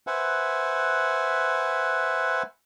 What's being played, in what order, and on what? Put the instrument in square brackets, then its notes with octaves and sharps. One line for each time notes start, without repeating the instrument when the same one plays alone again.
[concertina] B4 C5 E5 F#5 G#5